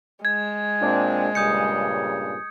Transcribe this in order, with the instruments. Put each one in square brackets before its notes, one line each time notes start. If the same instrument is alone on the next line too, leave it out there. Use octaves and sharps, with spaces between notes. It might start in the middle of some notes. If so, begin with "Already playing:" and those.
[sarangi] G#3 [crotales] G#6
[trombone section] A#2 C4 D4
[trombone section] G2 A#2 C#3 [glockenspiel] D#6 G6 C#7